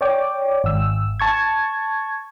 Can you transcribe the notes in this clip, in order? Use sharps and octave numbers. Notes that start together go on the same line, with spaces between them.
C#5 D5 G5 D6
G#1 E6
A5 C#6 G#6